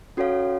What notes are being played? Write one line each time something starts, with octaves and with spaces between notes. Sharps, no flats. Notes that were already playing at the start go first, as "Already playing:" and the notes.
C#4 F#4 A4 C#5 F5